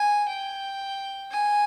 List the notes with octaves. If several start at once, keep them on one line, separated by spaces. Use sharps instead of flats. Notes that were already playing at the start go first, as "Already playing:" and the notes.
Already playing: G#5
G5
G#5